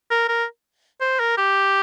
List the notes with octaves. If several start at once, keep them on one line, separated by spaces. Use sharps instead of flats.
A#4
A#4
C5
A#4
G4